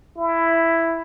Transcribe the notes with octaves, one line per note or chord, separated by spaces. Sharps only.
E4